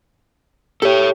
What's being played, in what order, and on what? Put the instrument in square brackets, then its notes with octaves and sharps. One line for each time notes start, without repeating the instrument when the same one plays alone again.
[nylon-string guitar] G4 [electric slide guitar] A4 C#5